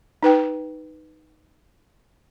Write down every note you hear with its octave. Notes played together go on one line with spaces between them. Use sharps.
D#4 B4 G5